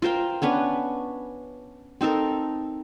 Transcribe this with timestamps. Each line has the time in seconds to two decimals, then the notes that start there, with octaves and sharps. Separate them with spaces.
0.02 F4 A#4 C5 G5
0.42 B3 C#4 D4 B4
2.01 C4 D#4 A4 A#4